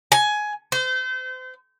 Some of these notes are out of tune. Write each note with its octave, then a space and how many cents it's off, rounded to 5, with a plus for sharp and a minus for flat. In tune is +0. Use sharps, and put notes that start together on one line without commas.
G#5 +15
C5 -35